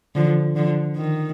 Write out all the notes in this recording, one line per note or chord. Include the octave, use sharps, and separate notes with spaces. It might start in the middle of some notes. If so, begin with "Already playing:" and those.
D3 F3
D3 F3
D#3